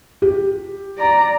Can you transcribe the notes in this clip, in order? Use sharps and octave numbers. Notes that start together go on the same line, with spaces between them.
G4
D5 A#5